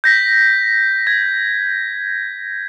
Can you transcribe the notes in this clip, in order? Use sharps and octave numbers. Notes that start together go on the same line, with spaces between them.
G6 A#6 B6
G#6